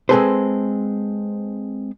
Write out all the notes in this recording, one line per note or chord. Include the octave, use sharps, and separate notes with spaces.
G#3 C4 G#4 A4 B4 C5